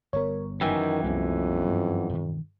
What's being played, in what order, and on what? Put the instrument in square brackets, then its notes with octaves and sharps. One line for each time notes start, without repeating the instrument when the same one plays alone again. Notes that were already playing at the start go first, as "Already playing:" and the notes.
[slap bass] G1 G3 B3 [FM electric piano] A#4 C#5
[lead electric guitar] F#2 E3 [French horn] D#3 [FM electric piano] G5 G#5
[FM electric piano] C2 [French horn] F2 [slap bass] G#3 A#3 B3
[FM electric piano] G2
[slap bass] E1 D#3